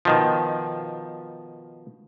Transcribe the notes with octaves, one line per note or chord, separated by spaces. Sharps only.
B2 D#3 F3